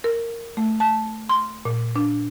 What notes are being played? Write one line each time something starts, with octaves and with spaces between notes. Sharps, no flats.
A#4
A3
A5
C6
A#2
D4